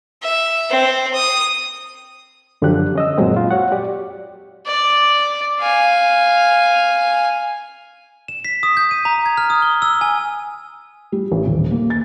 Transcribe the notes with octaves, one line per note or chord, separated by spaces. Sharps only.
E5
C4 C5
D#6
F#2 D3 F3 F#3 G4 F#6
C#4 D#5 E6
F#2 A#2 F#3 G#3 C4
F4
F#4 C#5 F#5
G4 D5
D5
F5 G#5
E7
B6
D#6
G6
D#7
A#5
G#6
F6
D#6
G7
E6
G#5
G3
A1
D#1
A#3
A6